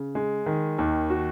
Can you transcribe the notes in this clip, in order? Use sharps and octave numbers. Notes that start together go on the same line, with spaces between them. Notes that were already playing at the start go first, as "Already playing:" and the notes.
Already playing: C#3
G#3
D#3
D#2
F#4